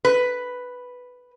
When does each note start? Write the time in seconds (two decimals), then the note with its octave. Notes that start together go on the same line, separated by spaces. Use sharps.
0.05 B4